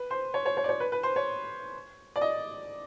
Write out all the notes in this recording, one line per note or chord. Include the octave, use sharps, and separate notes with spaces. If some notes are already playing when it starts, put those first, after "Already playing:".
Already playing: B4
C5
C#5
C#5
C#5
D5
C#5
B4
B4
C5
C#5
D5
D#5